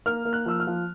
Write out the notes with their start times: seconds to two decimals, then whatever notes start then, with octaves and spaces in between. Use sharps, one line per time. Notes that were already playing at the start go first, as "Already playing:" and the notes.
0.06 A#3 F6
0.25 A#3
0.33 F#6
0.46 F3 E6
0.60 F6
0.67 F3